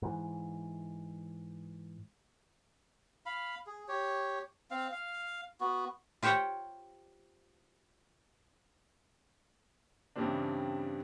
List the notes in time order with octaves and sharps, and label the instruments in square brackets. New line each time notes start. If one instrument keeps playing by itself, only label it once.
[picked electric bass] G#2 E3
[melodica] F5 B5
G#4
G4 C#5
C4 F5
F5
B3 F#4
[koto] F4 G4 C5 C#5 F#5 G5
[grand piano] G2 C#3 E3 G3 C4 D4